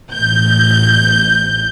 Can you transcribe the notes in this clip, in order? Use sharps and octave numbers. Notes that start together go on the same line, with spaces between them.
A1 G6